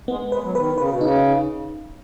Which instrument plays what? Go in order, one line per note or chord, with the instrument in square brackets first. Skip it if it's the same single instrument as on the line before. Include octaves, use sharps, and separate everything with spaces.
[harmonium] G#3 [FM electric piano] B3
[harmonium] G#3 [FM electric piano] B4
[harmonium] F#3
[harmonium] D#3 [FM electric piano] B4
[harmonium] C#3 [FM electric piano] B4
[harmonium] B2
[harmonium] C#3 [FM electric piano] D#4